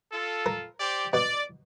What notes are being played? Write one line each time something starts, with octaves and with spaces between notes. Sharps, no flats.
F4 A4
A#4
G4 C5 D5
B2 D5